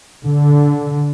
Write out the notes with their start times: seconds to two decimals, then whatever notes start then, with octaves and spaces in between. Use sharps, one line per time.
0.24 D3